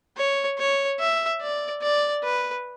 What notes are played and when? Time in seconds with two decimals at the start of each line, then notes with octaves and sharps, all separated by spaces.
0.17 C#5
0.58 C#5
1.00 E5
1.41 D5
1.82 D5
2.24 B4